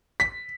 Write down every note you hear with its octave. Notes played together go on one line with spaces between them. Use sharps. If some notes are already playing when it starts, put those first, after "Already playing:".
B6